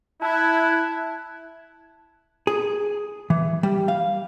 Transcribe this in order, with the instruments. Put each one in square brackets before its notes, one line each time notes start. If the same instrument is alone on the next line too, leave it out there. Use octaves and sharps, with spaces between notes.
[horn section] E4 [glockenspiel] A5 [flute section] F#6 G#6
[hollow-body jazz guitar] G#4
E3
G3
F5